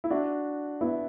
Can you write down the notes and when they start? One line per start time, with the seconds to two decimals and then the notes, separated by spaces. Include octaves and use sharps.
0.04 E4
0.10 D4 F#4
0.81 B3 E4